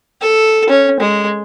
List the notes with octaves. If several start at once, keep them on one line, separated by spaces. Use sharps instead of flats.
A4
C#4
G#3